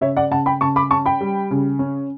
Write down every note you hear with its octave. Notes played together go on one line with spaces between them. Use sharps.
C#3 C#5 E5
D5 F#5
C#3 F#5 A5
G5 B5
C#3 A5 C#6
B5 D6
C#4 A5 C#6
G5 B5
G3
C#3
C#4